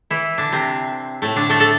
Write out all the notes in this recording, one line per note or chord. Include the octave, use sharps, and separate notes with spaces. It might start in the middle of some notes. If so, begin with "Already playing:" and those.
E3 E4
D3 D4
C3 C4
A2 A3
D3 D4
A3 A4
A3 A4